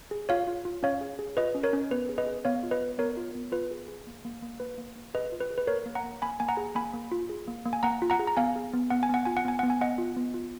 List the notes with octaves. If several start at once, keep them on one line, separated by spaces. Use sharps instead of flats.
G#4
F4 C#5 F5
F4
F4
C#4 C#5 F5
G#4
G#4
F4 B4 D#5
C#4
A#4 C#5
C#4
B3 B4
G#4
B4 D#5
G#4
B3 C#5 F5
F4
B4 D#5
B3
B3 A#4 C#5
F4
B3
F4 B4
G#4
G#4
A#3
A#3
A#3
A#3 B4
A#3
A#3
G#4 B4 D#5
F4
B4
G#4
B4
A#3 A#4 C#5
A#3
F#5 A#5
A#3
A#3 G#5 B5
A#3 G#5
F#5 A#5
G#4
A#3 G#5 B5
A#3
F4
G#4
A#3
A#3
G#5
A#3 F#5 A#5
F4
F#5 A#5
G#4
A#5
B3 F5 G#5
G#4
B3
B3 F#5
G#5
B3 F#5
F4 G#5
F#5
B3 G#5
B3 F#5
G#5
B3 D#5 F#5
F4
B3
F4